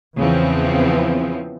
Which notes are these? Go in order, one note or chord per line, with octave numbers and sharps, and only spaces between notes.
E2 C#3 E3 F3 B3 C4